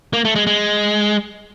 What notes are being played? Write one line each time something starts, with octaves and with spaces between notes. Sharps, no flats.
A#3
A3
G#3
G#3